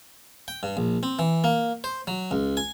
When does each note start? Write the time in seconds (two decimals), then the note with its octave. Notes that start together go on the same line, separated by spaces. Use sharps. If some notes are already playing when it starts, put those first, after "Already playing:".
0.48 G5
0.63 G2
0.77 A#1
1.03 C4
1.19 E3
1.44 A#3
1.84 C5
2.07 F#3
2.31 C#2
2.57 G#5